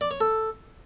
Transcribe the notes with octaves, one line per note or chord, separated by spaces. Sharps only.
D5
C#5
A4